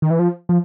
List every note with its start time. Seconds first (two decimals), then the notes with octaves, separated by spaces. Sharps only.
0.02 D#3
0.10 E3
0.19 F3
0.49 F3